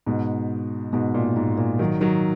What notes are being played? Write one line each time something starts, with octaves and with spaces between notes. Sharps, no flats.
G#2 B2
G#2 B2
A#2
G#2
A#2
D#3 F#3
D#3 F#3